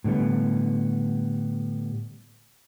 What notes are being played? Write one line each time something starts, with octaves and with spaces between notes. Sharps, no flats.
A2 D3 G3 B3